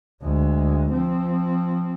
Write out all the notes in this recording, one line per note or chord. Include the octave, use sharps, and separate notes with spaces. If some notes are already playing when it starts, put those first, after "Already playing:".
D2 G#3
F3 C4